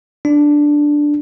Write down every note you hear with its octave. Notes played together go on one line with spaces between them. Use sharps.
D4